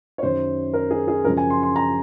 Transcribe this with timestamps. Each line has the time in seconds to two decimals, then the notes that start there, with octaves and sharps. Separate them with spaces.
0.18 C#5
0.23 F#2 D#3 C5
0.74 A#4
0.91 G#4
1.08 G#4
1.24 F#2 C#3 F3 A#4
1.37 G#5
1.50 C6
1.63 C6
1.76 A#5